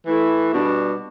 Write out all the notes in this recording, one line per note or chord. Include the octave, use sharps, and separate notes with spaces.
E3 A3 E4
B2 G3 D4